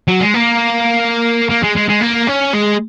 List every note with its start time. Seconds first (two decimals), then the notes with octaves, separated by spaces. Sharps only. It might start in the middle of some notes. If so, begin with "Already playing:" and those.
0.08 F#3
0.21 G#3
0.34 A#3
1.50 A#3
1.64 G#3
1.77 G#3
1.89 G#3
2.02 A#3
2.28 C#4
2.54 G#3